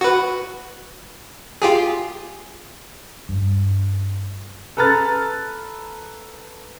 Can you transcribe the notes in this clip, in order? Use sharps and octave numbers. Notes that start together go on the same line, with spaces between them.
F#4 B4
F4 G4 G#4
G2
A4 B4 A#5 F6 A6